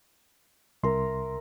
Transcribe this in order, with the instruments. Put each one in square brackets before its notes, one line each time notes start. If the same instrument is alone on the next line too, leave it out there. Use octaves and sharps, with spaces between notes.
[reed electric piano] C2 C6 [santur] A#4 E5